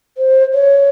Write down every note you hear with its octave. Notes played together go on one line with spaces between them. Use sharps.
C5
C#5